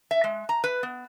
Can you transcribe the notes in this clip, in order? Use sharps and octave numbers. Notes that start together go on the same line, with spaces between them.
E5
G#3
A#5
B4
B3